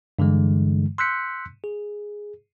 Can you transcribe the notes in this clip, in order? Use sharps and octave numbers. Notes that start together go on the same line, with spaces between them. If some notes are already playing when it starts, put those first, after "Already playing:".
G2 D3 E3 G#3
C6 E6 F#6 G6 B6 C#7
G#4